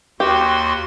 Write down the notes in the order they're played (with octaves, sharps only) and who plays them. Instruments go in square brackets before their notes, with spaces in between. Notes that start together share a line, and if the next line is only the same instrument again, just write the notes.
[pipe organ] D#2 F#4 C6 [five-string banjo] G4